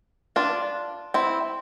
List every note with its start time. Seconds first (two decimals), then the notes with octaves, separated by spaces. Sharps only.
0.36 D4 F4
1.14 C4 E4